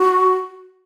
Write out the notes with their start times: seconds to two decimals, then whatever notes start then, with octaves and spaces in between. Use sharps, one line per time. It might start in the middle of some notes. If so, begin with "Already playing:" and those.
Already playing: F#4